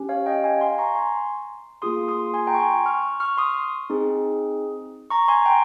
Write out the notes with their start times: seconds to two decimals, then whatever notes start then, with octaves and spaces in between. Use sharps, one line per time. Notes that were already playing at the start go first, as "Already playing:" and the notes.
Already playing: C#4 G4
0.09 C#5 F5
0.26 D#5 G5
0.44 F5 G#5
0.61 G#5 C6
0.78 A#5 C#6
0.95 G#5 C6
1.82 A#3 F4 G#4 C6 D#6
2.08 C6 D#6
2.34 G#5 C6
2.47 G5 A#5
2.54 C#6
2.60 G#5 C6
2.86 C#6 F6
3.20 C#6 F6
3.37 C6 D#6
3.90 C4 D#4 G#4
5.10 A#5 C#6
5.28 G#5 C6
5.46 G5 A#5